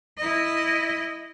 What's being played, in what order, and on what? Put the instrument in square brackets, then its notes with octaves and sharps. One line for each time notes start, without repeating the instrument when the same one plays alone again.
[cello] E4 D#5